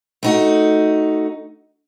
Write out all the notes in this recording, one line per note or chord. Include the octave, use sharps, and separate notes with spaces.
A3 D#4 F#4